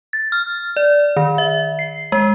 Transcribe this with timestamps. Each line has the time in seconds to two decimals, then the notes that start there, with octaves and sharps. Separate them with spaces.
0.13 A6
0.32 F6
0.77 D5
1.17 D#3
1.38 E5
1.79 C7
2.12 G#3